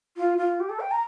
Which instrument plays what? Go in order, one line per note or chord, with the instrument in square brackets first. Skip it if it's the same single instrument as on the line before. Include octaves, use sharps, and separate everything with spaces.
[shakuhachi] F4
F4
G4
A4
G5
A#5